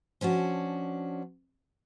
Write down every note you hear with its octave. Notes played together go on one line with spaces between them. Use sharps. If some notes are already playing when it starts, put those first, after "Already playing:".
F3 C#4 D4 F#4